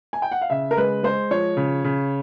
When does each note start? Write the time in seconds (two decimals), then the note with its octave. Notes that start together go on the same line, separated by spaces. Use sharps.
0.13 G#5
0.22 G5
0.32 F#5
0.42 F5
0.50 C#3 E5
0.71 A#4
0.77 G#3 B4
1.03 G#3 C5
1.31 F3 C#5
1.57 C#3
1.84 C#3